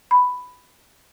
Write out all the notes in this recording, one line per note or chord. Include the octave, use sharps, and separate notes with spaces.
B5